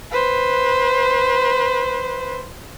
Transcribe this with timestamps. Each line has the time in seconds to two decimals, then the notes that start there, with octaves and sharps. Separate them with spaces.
0.11 B4 C5